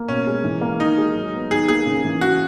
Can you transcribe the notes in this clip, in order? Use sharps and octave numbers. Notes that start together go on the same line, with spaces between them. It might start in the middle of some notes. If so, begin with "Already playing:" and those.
Already playing: A#3
B2 C#4
G#3
E3
A#3
D#3 D#4
G#3
F#3
B3
D#3 G#4
A#3 G#4
C#3
E3
C#3 F#4